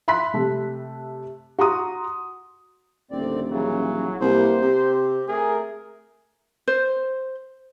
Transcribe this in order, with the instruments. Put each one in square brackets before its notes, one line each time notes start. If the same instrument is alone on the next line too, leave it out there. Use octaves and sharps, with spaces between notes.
[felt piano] E5 B5 C6 F#6 B6
C3 A3
F#4 A#5 C6 D#6
[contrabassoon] D#1 [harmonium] D2 C4 D5
[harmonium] C#3 E3 [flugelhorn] F#3
[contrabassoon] C2 [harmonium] C3 A#3 B3 [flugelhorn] C5
[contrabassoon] C3 [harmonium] C4 G4
[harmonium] A3 A#4 [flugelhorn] G#4
[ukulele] C5